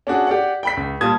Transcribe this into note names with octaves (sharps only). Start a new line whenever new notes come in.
C#4 D4 F#4 G#4
G4 D5 F#5
G5 B5 B6
C#2
A#2 G3 F4 A5 D#6 G#6